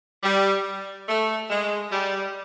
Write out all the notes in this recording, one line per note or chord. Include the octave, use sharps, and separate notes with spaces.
G3
A3
G#3
G3